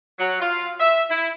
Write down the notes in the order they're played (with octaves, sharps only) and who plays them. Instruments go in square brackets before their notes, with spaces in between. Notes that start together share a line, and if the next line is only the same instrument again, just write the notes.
[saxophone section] F#3
F4
E5
E4